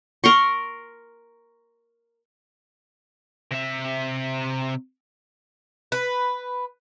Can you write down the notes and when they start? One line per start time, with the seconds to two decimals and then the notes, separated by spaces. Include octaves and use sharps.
0.24 A#4 C6 C#6
3.52 C3 E5
5.92 B4